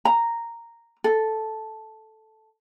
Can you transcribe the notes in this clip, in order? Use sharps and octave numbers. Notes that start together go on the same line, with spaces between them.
A#5
A4